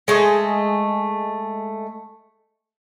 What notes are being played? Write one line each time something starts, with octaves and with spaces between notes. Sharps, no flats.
G#3 A3 D#5